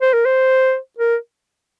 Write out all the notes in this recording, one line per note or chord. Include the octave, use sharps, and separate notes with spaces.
C5
A#4
C5
A#4